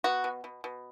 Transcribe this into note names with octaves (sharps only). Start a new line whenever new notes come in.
B3 F#4
B2
B2
B2